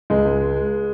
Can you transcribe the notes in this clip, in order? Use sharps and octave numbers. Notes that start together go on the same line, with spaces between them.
C#2 G#3
C#2